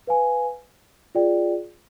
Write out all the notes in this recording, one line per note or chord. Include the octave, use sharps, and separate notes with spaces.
B4 F5 G#5
F4 G#4 D5 G5